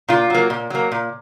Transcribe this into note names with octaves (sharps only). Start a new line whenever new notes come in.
A#2 F4
F#3 A#3
A#2
F#3 A#3
A#2